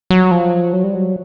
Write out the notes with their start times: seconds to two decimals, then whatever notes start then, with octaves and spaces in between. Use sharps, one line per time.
0.10 F#3
0.31 F3
0.73 F#3
0.84 G3
0.94 F#3